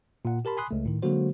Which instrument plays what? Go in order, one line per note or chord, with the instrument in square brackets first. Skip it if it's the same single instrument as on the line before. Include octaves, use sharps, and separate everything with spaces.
[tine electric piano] A#2 F#5
G4 A#4 A5 B5 C6
G#5 B5 C6 D#6 F#6
C#2 A3
A2 D#3
D3 F#3 G#3 A#3 F#4 C5